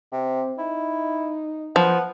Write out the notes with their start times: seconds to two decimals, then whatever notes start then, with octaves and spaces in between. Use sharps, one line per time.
0.12 C3 C4
0.59 D#4 E4
1.76 F3 B3